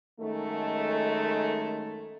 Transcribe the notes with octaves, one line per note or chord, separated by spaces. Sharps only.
F#2 D#3 G#3 A3